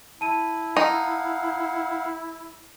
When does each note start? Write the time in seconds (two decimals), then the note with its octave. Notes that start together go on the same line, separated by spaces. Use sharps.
0.21 E4 A5 D#7
0.77 D#4 F5 F#5